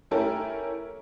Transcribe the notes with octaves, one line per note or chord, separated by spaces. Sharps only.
A3 C#4 E4 G4 A4 A#4